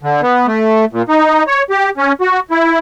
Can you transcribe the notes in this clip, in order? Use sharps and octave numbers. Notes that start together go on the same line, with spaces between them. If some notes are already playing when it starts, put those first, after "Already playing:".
D3
B3
A3
A#2
D#4
C#5
G4
C#4
F#4
E4